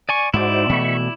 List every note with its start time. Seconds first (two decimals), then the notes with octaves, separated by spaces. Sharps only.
0.09 D5 G#5 C#6
0.34 G#2 D#4 E4 F#4 C5 D5
0.69 B2 E3 A3 B5 C#6